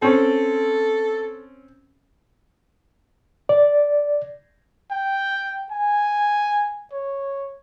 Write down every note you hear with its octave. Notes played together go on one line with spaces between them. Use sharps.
C4 C#4 A4
D5
G5
G#5
C#5